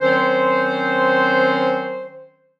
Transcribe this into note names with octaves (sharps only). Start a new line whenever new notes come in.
D#3 F#3 C4 C#4 C5